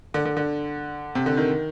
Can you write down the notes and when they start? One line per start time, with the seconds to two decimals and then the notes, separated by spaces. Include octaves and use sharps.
0.14 D3
0.25 D3
0.37 D3
1.15 C3
1.26 D3
1.37 D#3